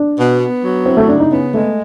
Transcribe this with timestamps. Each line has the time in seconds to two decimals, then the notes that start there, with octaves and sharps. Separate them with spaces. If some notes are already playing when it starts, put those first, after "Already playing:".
Already playing: D4
0.17 B2
0.40 B3
0.62 F#3
0.86 C4 E4
0.97 A3
1.08 C#3 D4
1.20 D#4
1.32 B3 C#4
1.54 G#3 A3